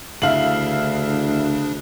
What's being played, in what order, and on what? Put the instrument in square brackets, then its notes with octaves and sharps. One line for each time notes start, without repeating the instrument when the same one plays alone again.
[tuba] D2 [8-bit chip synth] C#3 D4 [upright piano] E4 F5 F#7